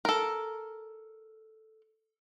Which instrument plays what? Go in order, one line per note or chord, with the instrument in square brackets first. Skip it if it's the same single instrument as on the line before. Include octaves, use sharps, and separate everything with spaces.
[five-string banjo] A4 A#4